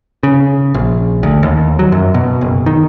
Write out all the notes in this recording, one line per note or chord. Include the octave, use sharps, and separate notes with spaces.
C#3
A#1
D2
D#2
F#3
F#2
B2
F#1
D#3